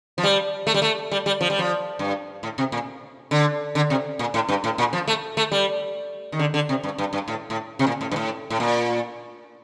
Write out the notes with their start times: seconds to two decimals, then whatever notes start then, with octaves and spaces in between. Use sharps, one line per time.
0.18 F3
0.24 G3
0.67 A3
0.74 G3
0.82 A3
1.11 G3
1.26 G3
1.41 F3
1.50 G3
1.59 F3
1.99 G2
2.43 A2
2.58 C3
2.72 A#2
3.31 D3
3.75 D3
3.90 C3
4.19 A#2
4.34 A2
4.49 G2
4.64 A2
4.78 A#2
4.93 F3
5.08 A3
5.37 A3
5.52 G3
6.32 D#3
6.39 D3
6.54 D3
6.69 C3
6.84 G2
6.98 G2
7.13 G2
7.28 A2
7.50 A2
7.79 C3
7.87 A#2
8.01 A2
8.11 G2
8.16 A2
8.50 A2
8.60 A#2